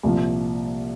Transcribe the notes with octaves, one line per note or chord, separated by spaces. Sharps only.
C2 A#2 F3